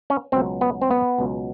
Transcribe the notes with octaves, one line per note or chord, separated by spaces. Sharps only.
C#4
C#2 B2 F#3 C4
B3
C4
B3
C#2 B2 F#3